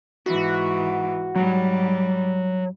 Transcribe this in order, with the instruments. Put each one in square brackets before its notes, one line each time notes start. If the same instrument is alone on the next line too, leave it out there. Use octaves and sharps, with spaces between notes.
[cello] G#2 E3 [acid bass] F#4
[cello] G#2 G3 [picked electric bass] F#3